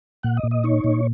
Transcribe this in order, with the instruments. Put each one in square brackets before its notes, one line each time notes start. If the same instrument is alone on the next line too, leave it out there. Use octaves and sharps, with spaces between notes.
[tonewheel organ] A#2 F#5
D#5
A#2
D#5
D#4 C#5
A#2